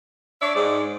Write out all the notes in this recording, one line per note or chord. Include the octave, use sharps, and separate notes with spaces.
D4 C#5 D5 E5
G#2